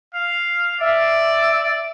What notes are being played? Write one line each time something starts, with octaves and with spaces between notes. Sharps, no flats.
F5
D5 E5